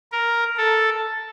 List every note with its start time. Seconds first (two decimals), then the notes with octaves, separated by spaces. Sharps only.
0.12 A#4
0.57 A4